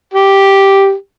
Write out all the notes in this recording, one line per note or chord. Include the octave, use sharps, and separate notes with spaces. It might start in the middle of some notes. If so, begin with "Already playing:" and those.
G4